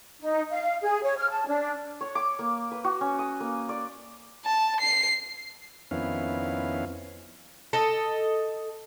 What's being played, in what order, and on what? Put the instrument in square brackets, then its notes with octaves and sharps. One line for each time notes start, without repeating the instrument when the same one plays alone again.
[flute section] D#4
F5
G#4
C#5
F6
A5
D4
[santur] C#5
D6
A#3
B4
F#4
C#4
D#6
A#3
D5
[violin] A5
C7
[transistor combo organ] F2 D#3 B3 C#4 E4 F5
[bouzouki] A4 D#5